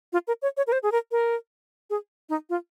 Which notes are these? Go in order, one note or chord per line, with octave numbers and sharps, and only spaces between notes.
F4
A#4
C#5
C#5
A#4
C5
G#4
A#4
A#4
G#4
D#4
F4